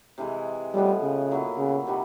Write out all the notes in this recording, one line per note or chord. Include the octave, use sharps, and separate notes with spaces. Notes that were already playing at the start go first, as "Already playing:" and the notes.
C3 E3 G#3
A2 F3 G3 G#3 B3
C#3
A#2 F#3 B3 E4
C#3
C3 D#3 G3 B3